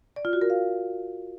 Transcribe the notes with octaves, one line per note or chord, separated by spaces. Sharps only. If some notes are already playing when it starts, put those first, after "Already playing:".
D5
F4
F#4
A#4
F5